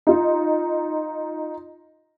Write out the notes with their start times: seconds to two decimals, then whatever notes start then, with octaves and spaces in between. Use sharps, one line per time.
0.07 D#4 F4